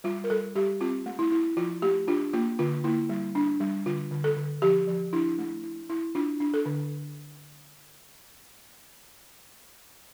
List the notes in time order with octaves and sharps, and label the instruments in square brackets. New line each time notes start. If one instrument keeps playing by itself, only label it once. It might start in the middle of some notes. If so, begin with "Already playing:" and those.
[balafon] G3 F4
A#4
G3 A4
G3 G4
C4 F4
A3
E4
E4
F3 F4
A3 G4
D4 F4
A#3 F4
D3 F4
A#3 E4
G3
D4
G3
D3 F4
D3
A4
D3
F3 G4
F3
D4 E4
A3
E4
E4
D4 F4
D4
A4
D3